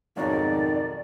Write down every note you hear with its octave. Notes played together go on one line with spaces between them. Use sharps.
B1 F2 G#2 D#3 F#4 C#5 D5 A#5